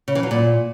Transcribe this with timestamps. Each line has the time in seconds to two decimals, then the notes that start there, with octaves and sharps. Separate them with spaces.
0.08 C#3
0.15 E3
0.23 F#3
0.31 A#2